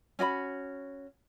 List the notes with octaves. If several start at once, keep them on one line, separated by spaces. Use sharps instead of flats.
C#4 F#4 D5 B5